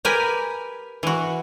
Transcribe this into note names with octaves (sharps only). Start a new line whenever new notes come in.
G4 A#4 B4 G#5
E3 F#4